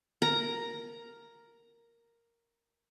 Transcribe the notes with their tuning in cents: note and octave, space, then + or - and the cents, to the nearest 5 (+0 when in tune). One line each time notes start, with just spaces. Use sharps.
A#4 +0 A#5 +0